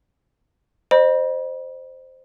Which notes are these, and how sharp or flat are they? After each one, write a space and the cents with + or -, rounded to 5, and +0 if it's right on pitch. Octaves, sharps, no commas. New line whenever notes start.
C5 +0 D#5 -35 B5 -40